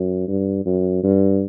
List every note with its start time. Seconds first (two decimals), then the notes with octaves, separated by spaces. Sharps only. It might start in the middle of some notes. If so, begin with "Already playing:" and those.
Already playing: F#2
0.28 G2
0.66 F#2
1.04 G2